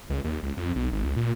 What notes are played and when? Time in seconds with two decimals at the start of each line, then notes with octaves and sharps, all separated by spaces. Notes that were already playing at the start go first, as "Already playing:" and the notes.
0.10 C#2
0.24 D#2
0.43 C#2
0.57 F2
0.76 B1
0.92 G#1
1.04 C#2
1.17 A#2